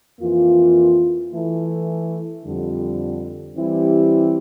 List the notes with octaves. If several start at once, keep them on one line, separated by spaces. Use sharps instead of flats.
F2 E3 A#3 F4
E3 A3 E4
F2 D3 G3
E3 G3 C4 E4 G4